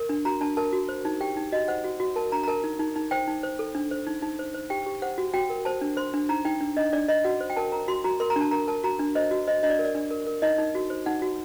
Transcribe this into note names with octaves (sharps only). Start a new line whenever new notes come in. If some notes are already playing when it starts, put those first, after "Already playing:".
Already playing: A#4
D4
F#4 A#5
D4 A5
A#4 A5
F#4
C5
D#4
G4 G5
D#4
F#4 D#5
C5 F#5
F#4
F#4
A#4 A5
D4 A#5
A#5
A#4 A5
D#4
D#4
D#4
C5 G5
D#4
C5
A4
D4
C5
D#4
D#4
C5
C5
G4 G5
G4
C5 F#5
F#4
F#4 G5
A#4
C5 A5
D4
C5 C6
D4
D#4 A#5
D#4 G5
D4
D4 D#5
D4 D5
D4 D#5
F#4 F#5
C5
G5
A#4 A5
A#4 A#5
F#4 C6
F#4 A#5
A#4 C6
A#5
D4
A5
A#4 A#5
A#4 A5
F#4 A#5
D4
C5 D#5
F#4
C5 D#5
D4 D#5
D5
A#4
D5
D4
A#4
A#4
D#4 D#5
D#4
F#4
C5
D#4 F#5
F#4